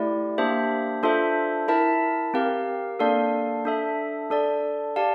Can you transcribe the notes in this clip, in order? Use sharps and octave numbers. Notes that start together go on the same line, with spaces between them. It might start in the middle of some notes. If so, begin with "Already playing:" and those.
Already playing: A3 E4 G4 D5
A#3 D4 G4 C5 E5
D4 F4 A4 C5 E5
E4 A#4 E5 A5
C4 G4 A#4 F5
A#3 D4 A4 D5 F5
D4 A4 E5
D4 A4 D5
G4 D5 F5 A5